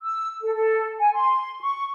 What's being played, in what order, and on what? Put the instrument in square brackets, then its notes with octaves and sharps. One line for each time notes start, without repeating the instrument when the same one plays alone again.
[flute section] E6
A4
A4
G#5
C6
C#6